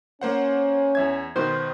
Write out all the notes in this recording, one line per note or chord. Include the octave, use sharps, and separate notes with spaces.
A#3 C#4 C5 F#5
E2 E5 G#6
B2 D#3 B3 C5